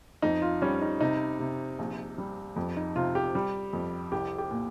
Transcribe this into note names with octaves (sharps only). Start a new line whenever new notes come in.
F2 D#4
F4
G3 C#4
D#4
C3 D#4
C3
A#1
G3
F2
D#4
C3 F4
G4
G3
F2
C2 G4
G4
A#2